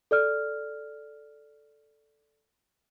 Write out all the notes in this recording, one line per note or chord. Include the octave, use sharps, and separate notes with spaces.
A4 D5 F6